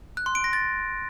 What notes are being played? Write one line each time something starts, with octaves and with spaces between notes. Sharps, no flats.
F#6
C6
D7
A#6
A6